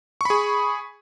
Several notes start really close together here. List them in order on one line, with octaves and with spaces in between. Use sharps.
C#6 B5 G#4